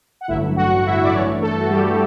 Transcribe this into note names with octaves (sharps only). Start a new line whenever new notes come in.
F#5
A1 G2 D3 F#3 A3 E4 E5
F#4 F#5
E4 E5
D5
G2 E3 A3 C#4 C#5
A3 A4
F#4
G3 G4